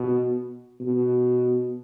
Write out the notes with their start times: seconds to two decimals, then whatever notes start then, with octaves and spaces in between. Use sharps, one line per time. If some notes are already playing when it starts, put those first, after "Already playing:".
Already playing: B2
0.81 B2